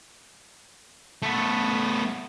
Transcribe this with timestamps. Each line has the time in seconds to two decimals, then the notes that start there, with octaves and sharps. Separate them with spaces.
1.22 A3 B3